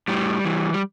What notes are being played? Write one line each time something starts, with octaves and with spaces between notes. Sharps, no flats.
A2 G3
E3
G3